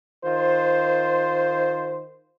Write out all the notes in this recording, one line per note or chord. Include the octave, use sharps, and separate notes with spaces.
D#3 F4 C5